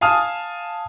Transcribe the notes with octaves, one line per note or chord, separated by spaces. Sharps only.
F5 G#5 A5 D#6 F6